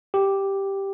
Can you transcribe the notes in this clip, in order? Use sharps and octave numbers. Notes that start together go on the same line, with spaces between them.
G4